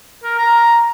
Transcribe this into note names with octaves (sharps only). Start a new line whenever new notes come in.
A#4
A#5